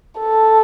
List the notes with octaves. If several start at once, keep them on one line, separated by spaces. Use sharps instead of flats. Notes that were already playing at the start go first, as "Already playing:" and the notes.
A4